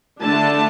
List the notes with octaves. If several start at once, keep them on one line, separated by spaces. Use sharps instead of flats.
D3 A3 D4 A5